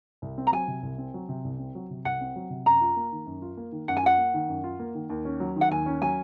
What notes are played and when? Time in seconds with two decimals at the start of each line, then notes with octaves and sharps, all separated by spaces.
0.22 C2
0.38 C4
0.47 A#5
0.52 F#3 G#5
0.68 C3
0.83 C2
0.98 C4
1.14 F#3
1.29 C3
1.44 C2
1.59 C4
1.75 F#3
1.90 C3
2.05 C2 F#5
2.21 C4
2.36 F#3
2.50 C3
2.66 F#2 A#5
2.81 F4
2.97 A#3
3.12 D#3
3.26 F#2
3.42 F4
3.57 A#3
3.72 D#3
3.88 F#2 F#5
3.97 G#5
4.03 F4 F#5
4.18 A#3
4.34 D#3
4.49 F#2
4.64 F4
4.80 A#3
4.95 D#3
5.10 D#2
5.25 C#4
5.40 F#3
5.56 D#3
5.61 F#5
5.71 D#2 G#5
5.86 C#4
6.01 F#3 G#5